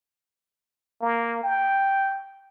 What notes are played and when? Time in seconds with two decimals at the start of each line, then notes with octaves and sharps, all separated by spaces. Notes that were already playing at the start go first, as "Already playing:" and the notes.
1.01 A#3
1.44 G5